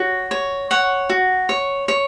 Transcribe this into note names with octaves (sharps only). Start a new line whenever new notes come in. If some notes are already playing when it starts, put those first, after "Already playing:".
Already playing: F#4 C#5
C#5
C#5 F#5
F#4
C#5
C#5